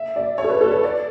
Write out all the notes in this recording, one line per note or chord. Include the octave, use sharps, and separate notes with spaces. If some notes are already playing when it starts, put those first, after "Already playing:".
Already playing: E5
D5
C#5
A4
B4
A4
B4
D5